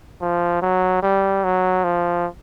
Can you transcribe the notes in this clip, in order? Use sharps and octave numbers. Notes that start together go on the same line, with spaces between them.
F3
F#3
G3
F#3
F3